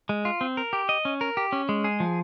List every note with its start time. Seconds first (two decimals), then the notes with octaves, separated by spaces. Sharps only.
0.09 G#3
0.25 F4
0.41 C4
0.57 A#4
0.73 G4
0.89 D#5
1.05 C#4
1.21 A#4
1.37 G4
1.52 C#4
1.69 G#3
1.84 G#4
2.00 F3